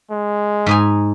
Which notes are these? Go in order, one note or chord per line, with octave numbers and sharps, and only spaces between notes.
G#3
G#2 D#4 G#5